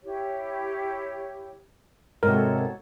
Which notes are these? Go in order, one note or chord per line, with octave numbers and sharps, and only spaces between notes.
E4 G4 C#5
G#2 C3 F#4 A4 A#4 C#5